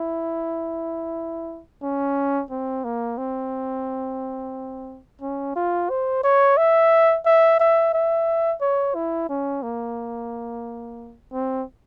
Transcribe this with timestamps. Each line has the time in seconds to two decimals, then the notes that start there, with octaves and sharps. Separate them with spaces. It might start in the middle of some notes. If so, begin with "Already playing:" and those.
Already playing: E4
1.82 C#4
2.50 C4
2.84 A#3
3.18 C4
5.21 C#4
5.56 F4
5.89 C5
6.24 C#5
6.57 E5
7.25 E5
7.59 E5
7.93 E5
8.61 C#5
8.95 E4
9.29 C#4
9.63 A#3
11.33 C4